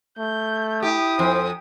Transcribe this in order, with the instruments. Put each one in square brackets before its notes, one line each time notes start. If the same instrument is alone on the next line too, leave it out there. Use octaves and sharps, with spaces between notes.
[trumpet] A3 [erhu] G6
[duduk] E4 [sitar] G4 [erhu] D#6
[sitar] F2 [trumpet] C5